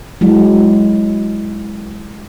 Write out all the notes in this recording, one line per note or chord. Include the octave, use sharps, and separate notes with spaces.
F#3 G#3 E4